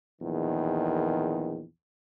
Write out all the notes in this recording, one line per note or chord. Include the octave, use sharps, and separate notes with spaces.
A#1 E2 D#3